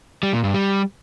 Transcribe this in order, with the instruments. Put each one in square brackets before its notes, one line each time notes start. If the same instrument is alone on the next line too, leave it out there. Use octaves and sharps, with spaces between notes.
[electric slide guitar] G3
A#2
G2
G3